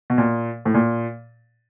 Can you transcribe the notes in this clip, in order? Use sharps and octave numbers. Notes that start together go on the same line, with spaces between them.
B2
A#2
A2
A#2